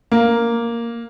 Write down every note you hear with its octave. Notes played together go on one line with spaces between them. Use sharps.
A#3